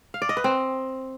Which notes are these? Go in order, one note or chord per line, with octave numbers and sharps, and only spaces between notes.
F5
D5
D#5
B4
C4